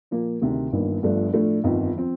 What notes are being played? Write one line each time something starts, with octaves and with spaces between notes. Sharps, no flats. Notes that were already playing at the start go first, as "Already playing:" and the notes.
A#2 F3 A#3 F4
D2 C3 D#3
G1 G2 D#3 A#3
G1 G2 F3 A3 D4
A2 F3 A3 D4
G1 F2 D#3
F3 C4